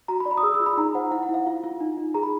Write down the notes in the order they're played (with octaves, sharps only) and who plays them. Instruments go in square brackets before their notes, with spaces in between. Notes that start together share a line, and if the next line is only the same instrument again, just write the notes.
[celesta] F#4 A#5
B5
D5
B5
D#6
G#4 E6
E6
F4
B5
D#4 A#5
C5 F#5
E4 F#5
F#5
E4
F5
F4
F4
D#4
D#4
G#4 A#5
B5